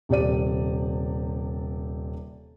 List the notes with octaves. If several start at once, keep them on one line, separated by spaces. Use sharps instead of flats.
D#1 C3 G4 D5 D#7